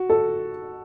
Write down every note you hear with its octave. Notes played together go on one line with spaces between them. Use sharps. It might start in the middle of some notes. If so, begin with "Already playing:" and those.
Already playing: F#4
A4